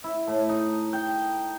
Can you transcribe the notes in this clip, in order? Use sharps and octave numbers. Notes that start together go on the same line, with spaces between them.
E4
A2
D#4
G5